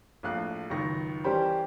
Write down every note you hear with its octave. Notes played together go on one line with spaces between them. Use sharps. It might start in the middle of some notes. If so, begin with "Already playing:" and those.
A#1 A2 F5 F#6
C#2 F#2 D#3 C#6 A#6
E3 G3 C#4 G4 A#4 C5